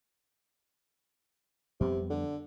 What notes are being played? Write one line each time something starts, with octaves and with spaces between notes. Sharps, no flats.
F2 C3 G3 B3
D3